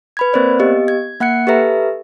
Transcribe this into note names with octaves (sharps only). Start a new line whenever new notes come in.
B4 B5 G#6
A#3 C4 A#4 C5 D5
B3 G4 D#5
G#6
A#3 F#5 F#6 C#7
G4 A4 B4 E5 A#5